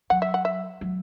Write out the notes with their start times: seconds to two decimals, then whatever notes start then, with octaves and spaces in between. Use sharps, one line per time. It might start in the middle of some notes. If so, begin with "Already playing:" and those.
0.10 F#3 F#5
0.22 E5
0.34 F#5
0.45 E5
0.81 F#3